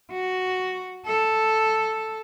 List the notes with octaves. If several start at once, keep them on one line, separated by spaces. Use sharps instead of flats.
F#4
A4